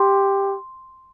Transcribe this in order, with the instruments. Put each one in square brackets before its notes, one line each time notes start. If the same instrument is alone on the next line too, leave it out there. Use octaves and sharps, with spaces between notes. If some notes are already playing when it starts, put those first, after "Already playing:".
Already playing: [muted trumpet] G4 [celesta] C6